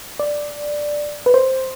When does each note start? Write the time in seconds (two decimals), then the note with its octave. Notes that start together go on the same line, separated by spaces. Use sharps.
0.20 D5
1.26 B4
1.34 C5